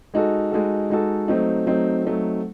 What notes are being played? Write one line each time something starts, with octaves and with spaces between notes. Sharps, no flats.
G#3 D#4 F#4 A4
G#3 D#4 F#4 A4
G#3 D#4 F#4 A4
F#3 A3 C4 D#4
F#3 A3 C4 D#4
F#3 A3 C4 D#4